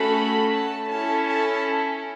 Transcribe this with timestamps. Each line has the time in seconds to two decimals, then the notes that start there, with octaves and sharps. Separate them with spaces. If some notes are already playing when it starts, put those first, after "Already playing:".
Already playing: A3 C#4 F#4 A4 B5
0.53 A5
0.90 C#4 E4 A4 A5
1.26 A5